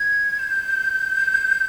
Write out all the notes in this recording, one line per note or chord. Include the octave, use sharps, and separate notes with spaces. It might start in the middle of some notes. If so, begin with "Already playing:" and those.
Already playing: G#6
G6